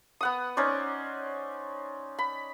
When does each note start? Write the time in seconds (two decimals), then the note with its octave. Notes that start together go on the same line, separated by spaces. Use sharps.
0.21 B3 F#5 D#6
0.57 C#4 D#4 C5 D5
2.18 B5